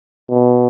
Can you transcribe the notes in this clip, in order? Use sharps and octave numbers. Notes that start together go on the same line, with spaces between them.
B2